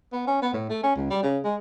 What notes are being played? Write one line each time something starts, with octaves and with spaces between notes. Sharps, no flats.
B3
C#4
B3
A2
A3
C#4
C#2
G3
C#3
G#3